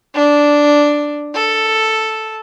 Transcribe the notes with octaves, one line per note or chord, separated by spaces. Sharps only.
D4
A4